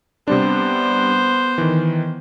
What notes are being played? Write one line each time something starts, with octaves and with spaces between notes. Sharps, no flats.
C3 G3 B3 D4 C5
D#3 E3